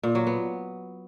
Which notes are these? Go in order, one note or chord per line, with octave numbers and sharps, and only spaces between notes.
A#2
F#3
B3